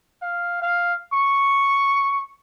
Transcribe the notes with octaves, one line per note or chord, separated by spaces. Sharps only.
F5
F5
C#6